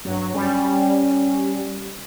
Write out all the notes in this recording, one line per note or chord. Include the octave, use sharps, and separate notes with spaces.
G2 F#3
G3 C#4